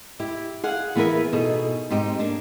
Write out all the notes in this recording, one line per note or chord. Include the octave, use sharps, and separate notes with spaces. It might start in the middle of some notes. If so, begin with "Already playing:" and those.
E4 G4
G#4 F5 F#5
E3 B3 G#4 A#4 B4 E5
B2 D#4 G#4 A4
G#2 C4 D#4 G4
A#3 D4